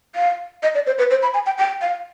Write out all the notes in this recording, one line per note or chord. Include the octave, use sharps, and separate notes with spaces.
F5
D#5
D5
C5
B4
C5
B5
G#5
G5
G5
F5